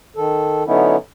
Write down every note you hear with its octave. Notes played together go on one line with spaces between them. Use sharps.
D#3 A4
D3 F#3 B3 C#4 D#4 E4